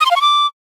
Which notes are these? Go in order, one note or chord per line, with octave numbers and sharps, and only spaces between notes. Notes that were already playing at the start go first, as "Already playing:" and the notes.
D#6
C6
F5
C#6
D6